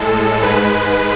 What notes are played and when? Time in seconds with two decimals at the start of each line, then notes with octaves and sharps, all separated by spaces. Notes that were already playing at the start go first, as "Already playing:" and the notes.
Already playing: A2 G#3 A4
0.43 G#2 G#3 B4